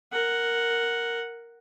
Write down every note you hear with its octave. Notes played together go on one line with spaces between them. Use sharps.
A#4 F#5